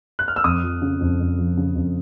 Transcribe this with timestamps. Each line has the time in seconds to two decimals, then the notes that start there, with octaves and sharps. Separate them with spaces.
0.19 F#6
0.28 F6
0.36 E6
0.44 F2 D#6
0.63 F3
0.82 C#3
1.00 F2
1.20 F2
1.39 F3
1.57 C#3
1.75 F2